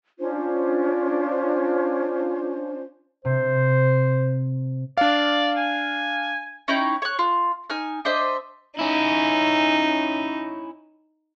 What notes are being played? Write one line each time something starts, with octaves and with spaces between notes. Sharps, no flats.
C#4 D4 F4 C5
C3 C5
D4 D5 F5
G#5
C#4 D#4 E4 G5
C#5 F#6
F4
D#4 G#5 F6
D4 C5 D#5 E5
C#4 D#4 E4